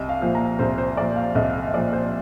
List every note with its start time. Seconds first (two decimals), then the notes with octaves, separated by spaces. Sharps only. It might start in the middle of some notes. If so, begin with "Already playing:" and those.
Already playing: C2 D#5
0.09 F5
0.21 A#2 F3
0.35 A#5
0.59 C2 C5
0.78 C5
0.97 A#2 F3 D5
1.16 F5
1.35 C2 D#5
1.68 D#5
1.73 A#2 F3 D5
1.93 C5